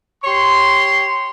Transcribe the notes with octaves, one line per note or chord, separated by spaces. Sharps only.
G4 C#5 C6